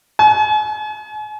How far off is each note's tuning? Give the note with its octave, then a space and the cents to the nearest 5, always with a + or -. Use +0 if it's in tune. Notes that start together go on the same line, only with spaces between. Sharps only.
G#5 +40